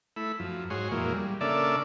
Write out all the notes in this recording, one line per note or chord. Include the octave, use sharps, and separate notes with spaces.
A3 E4 B5
F#2 F3
G#2 F#4 G#4 C#5 C6
F2 A#2 E3 F#3 G#3 A#3
G3
C#3 A#3 D4 A4 D5 E5